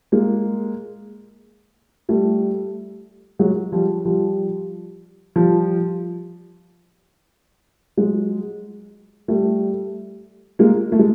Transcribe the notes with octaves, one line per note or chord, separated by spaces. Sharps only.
G#3 A#3
G3 A3
F#3 G#3
F3 G3
F3 G3
F3 G3
F#3 G#3
G3 A3
G#3 A#3
A3
G#3